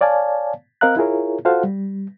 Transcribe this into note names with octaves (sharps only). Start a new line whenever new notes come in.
C#5 D5 F5 G#5 A5
C4 A#4 D#5 F5 A#5 F#6
E4 F4 G#4 A#4 C#5
F4 F#4 A4 C5 F5 F#5
G3